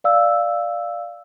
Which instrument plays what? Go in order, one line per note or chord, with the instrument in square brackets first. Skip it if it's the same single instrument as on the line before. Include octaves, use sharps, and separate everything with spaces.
[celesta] D5 F5 E6